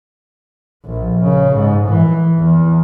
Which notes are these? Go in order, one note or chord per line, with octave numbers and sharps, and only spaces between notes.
A#1
C#3
G#2
E3
E2